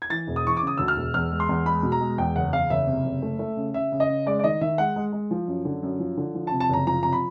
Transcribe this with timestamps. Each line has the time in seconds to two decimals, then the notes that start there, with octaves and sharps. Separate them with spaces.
0.02 G#6
0.10 E3 A6
0.27 E1
0.36 D#6
0.45 E3 C#6
0.57 C#3 D6
0.67 D#6
0.78 D2 E6
0.88 F6
0.96 E1
1.14 E2 F6
1.31 G#3
1.40 C6
1.49 E2
1.66 G#3 B5
1.83 B2
1.92 A#5
2.01 G#3
2.18 E2 G5
2.36 F#1 F#5
2.53 E2 F5
2.70 F#1 E5
2.87 C3
3.05 F#1
3.22 A3
3.39 A3
3.57 C#3
3.74 C#3 E5
3.92 C#3
4.00 D#5
4.09 C#3
4.26 G#3 D5
4.39 D5
4.44 D#3 D#5
4.61 D#3 E5
4.78 G#3 F#5
4.96 G#3
5.13 G#3
5.31 F3
5.48 F#2
5.65 D3
5.83 F#2
6.00 F3
6.17 D3
6.34 F3
6.47 A5
6.52 C3
6.60 A5
6.69 F#1 A#5
6.87 F3 A#5
7.03 C3 A#5
7.13 B5